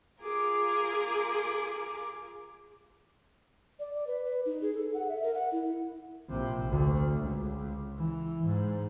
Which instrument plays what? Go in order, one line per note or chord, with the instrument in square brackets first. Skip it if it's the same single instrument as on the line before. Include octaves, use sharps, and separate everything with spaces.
[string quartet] F4 G#4 A#4 D6
[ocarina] D5
D5
B4
B4
D#4
G#4
A4
F#5
E5
A#4
F#5
E4
[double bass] A#1 C3
D2
C#2
E3
G#2